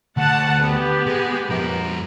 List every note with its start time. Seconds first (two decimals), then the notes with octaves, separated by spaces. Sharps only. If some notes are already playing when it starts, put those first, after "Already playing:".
0.17 D2 F#5 A5
0.62 B3 G4
1.06 G#3
1.50 F2 A#4